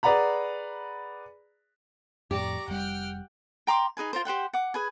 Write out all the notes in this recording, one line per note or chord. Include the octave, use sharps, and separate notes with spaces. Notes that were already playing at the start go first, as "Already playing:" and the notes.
G#4 B4 D5 F#5 A#5 B5
F2 A2 G4 D5 A#5 C#6
F1 G3 F#5 G5 F6
G5 A#5 C6 D6
D#4 G#4 B4 G#5
F4 A#4 C5
G4 C5 F#5 G5
F#5 D6
G#4 B4 G#5